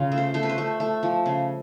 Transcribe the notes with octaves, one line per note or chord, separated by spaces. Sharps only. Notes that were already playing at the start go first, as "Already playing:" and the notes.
Already playing: C#3 F4
A3
C5
A3 C5
B4
C5
A3
A3
F3
C#3